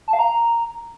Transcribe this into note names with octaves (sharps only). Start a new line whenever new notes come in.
A5
F5
A#5